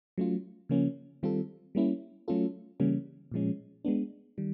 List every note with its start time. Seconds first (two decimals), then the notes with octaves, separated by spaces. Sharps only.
0.18 F#3 A3 C#4 F4
0.69 C#3 F3 A#3 C#4
1.23 D#3 G3 C4 F4 A4
1.75 G3 A#3 C#4 E4
2.28 F#3 A3 C#4 F4 A4
2.80 C#3 E3 G3 A#3 C#4
3.32 A#2 F3 G#3 C#4
3.85 G#3 B3 D4
4.38 D#3 G3